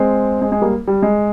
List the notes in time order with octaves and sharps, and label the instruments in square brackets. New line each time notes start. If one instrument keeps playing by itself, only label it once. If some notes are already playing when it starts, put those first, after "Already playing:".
Already playing: [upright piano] G#3 C4
G#3
G#3
G3 A#3
G3
G#3